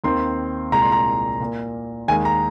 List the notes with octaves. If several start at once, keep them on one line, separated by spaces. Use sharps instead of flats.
D#2 D#3 C4 C6
C2 A#2 G#3 A#5
C6
A#5
A#2 A#3
D#2 D#3 G#3 G#5
A#5